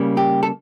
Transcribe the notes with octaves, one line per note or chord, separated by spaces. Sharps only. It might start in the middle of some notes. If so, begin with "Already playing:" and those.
Already playing: C#3 G3 A#3
G4
A4